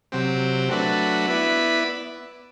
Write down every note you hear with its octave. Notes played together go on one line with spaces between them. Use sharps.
C3 F#3 C4 G4
F#3 A3 D4 F#4 B4
B3 E4 B4 D5